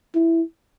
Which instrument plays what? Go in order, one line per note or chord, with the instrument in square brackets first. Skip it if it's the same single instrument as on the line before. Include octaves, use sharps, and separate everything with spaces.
[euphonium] E4